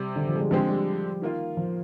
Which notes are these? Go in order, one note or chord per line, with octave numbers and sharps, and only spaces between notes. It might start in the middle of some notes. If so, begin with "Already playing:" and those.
Already playing: C3 G3 C4
D3
F3
G#3
G3
D3 F3 G#3 C4 G4
G3
D#3 A#3 F4
F3